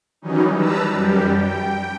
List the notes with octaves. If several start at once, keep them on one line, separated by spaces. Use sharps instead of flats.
D#3 E3 F#3 G3 C#4 D#4
G3 B4 A5 A#5 E6
F#2 G3 G4
G5